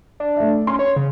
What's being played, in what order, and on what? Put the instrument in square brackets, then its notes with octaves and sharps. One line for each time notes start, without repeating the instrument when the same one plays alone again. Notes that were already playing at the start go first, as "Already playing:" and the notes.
[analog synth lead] D4
[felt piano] A3 E5
[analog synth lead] C#4 [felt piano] C6
[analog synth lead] C#5
C#3